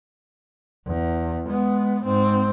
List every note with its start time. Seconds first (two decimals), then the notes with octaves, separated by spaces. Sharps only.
0.86 E2
1.49 G#3 B3
2.05 G#2 C4